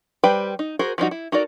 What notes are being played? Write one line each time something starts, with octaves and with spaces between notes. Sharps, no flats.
G3 B4 C5 G5 B5
D#4
F#4 G#4 A#4 C5
F3 G3 D#4 F#4
E4
D#4 F#4 A4 A#4 D5